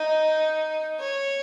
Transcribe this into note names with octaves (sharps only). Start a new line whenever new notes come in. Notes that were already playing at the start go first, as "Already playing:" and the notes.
Already playing: D#4
C#5